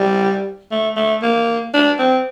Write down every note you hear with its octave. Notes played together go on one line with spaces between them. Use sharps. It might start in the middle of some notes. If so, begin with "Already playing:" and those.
Already playing: G3
A3
A3
A#3
D4
C4